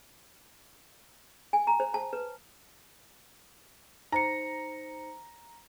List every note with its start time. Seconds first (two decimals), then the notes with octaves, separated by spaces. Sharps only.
1.53 G#5
1.67 A#5
1.80 C5
1.94 A5
2.13 B4
4.12 D#4 C5 A#5 C#7